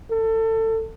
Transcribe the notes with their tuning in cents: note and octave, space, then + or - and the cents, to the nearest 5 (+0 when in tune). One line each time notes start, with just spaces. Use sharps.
A4 +25